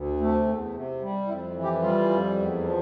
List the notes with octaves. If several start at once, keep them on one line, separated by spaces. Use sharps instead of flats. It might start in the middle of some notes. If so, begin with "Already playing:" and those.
Already playing: D2
C3 A3
E2
C3
G3
F2 E4
E3
G4
G3 F4
F2
E2
F3